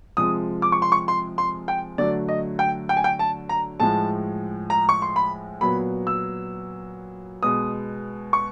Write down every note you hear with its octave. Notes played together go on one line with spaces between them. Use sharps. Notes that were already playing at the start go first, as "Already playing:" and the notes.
C3 F3 G#3 D#6
D6
C#6
C6
C#6
C6
C6
G5
D3 F#3 A3 D5
D#5
G5
G5
G#5
G5
A5
A#5
A2 F3 G#3 A5
A#5
C#6
C6
B5
A#2 F#3 B3 B5
E6
B2 G#3 B3 D#6
C#6